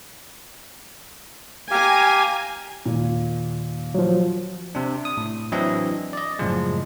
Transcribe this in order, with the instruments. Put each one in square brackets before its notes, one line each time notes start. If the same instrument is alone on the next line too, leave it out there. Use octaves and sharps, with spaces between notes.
[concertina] G4 F5 [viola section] G#5 A#5
[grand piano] D#2 A#2
[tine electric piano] F3 F#3
C3 D4
D#6
A2
E3 F#3 C4 D4 E4 D#5
D5 D#5
F#2 A2 C#3 F3 G#3